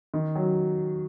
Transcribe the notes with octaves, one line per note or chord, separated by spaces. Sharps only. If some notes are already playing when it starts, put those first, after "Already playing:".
D#3
F#3